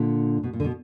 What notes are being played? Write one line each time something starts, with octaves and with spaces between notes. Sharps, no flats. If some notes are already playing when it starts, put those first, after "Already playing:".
Already playing: A#2 D3
B2
A#2
D3
B2